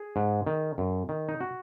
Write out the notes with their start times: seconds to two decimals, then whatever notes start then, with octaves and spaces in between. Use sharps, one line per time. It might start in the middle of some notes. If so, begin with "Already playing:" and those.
Already playing: G#4
0.16 G#2
0.47 D#3
0.78 F#2
1.09 D#3
1.29 D#4
1.40 F#4